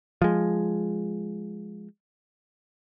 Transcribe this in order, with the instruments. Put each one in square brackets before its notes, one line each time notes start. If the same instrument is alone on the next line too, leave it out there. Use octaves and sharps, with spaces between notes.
[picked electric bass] F3 G#3